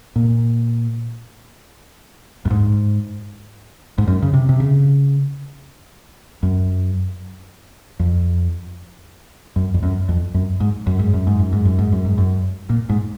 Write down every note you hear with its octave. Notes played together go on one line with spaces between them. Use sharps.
A#2
F#2
G#2
G#2
F#2
C#3
C3
C3
C#3
F#2
F2
F#2
F2
F#2
F2
F#2
G#2
F#2
G#2
F#2
G#2
F#2
G#2
F#2
G#2
F#2
G#2
F#2
A#2
G#2